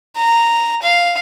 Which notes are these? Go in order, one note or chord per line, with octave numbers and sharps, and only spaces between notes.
A#5
F5